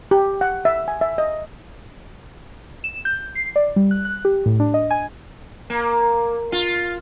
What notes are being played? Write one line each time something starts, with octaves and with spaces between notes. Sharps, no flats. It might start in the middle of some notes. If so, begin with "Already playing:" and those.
G4
F#5
E5
G#5
E5
D#5
E7
G6
C7
D5
G3
F#6
F#6
G4
A2
D4
D#5
G#5
A#3
F4